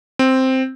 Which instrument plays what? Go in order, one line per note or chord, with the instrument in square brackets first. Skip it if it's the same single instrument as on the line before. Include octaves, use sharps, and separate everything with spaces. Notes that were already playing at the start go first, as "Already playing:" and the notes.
[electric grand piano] C4